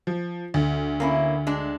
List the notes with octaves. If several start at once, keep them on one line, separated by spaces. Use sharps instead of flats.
F3
D2
A#3 C#4 E4
G#3 D4